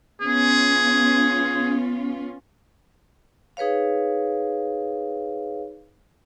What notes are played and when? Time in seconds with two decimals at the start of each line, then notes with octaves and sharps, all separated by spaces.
0.21 B3 C#4 F4 G#4
3.57 D#4 G#4 B4 C#5 F5